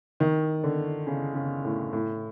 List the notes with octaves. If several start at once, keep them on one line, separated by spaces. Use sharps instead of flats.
D#3
D3
C#3
C#3
A2
A2